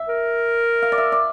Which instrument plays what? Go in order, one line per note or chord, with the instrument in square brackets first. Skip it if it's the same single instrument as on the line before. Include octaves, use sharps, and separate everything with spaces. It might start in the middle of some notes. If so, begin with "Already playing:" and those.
Already playing: [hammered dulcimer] E5
[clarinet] A#4
[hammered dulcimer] F5
D5
E5
D5